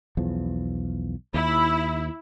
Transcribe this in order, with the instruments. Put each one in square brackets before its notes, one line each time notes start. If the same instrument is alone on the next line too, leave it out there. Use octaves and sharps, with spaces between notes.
[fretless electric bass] B1 E2 F3
[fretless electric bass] D#2 [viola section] E4